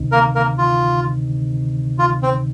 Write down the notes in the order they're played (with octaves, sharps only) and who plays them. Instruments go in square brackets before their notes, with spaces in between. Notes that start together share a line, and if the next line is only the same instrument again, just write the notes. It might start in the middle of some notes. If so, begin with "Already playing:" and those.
Already playing: [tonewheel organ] D2 C3 D#3
[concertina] A#3 A#4
A#3 A#4
F4
F4
C4